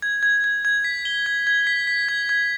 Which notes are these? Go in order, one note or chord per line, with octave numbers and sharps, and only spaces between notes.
G#6
G#6
G#6
G#6
B6
G7
G#6
G#6
B6
B6
G#6
G#6